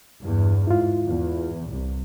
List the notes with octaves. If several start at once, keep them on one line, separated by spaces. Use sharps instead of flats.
E2 G2
G#2 E4 F4
E2
C2